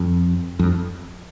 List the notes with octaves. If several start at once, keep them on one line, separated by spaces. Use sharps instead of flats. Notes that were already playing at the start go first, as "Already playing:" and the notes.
Already playing: F2
F2